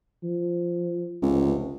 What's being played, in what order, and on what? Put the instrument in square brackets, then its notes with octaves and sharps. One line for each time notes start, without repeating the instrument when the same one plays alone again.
[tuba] F3
[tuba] F1 [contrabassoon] C#2